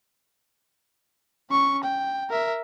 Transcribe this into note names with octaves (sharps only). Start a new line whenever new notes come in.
C#4 C#6
G5
A#4 E5